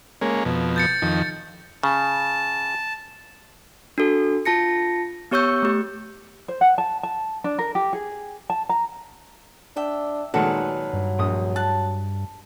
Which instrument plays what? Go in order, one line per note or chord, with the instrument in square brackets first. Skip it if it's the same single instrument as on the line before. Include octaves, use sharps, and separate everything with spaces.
[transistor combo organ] G#3 A#3 C#4
F2 B2
[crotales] G6 A6 C#7
[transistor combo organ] F2 D#3
[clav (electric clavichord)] C#3 [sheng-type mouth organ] A5
[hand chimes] D4 F#4 A4
F4 A5 A#6 C#7
B3 G4 C#5 C#6 E6 G6
A3 G4
[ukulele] C5
F#5
A5
A5
D4
A#4
G4
G#4
A5
A#5
[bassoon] D4 [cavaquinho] E5 G5
[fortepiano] A#2 D#3 G#3 [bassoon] F#3 [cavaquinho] F#4 A4 B4
[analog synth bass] G2
[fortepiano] A#1 D#6
[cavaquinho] A5 [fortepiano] F#6